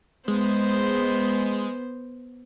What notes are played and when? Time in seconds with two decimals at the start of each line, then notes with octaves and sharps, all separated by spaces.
0.28 G#3 B3 C5